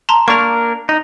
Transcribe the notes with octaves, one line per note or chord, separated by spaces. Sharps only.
A5 A#5 C6
A#3 D4 A#4 A#5 C#6
D#4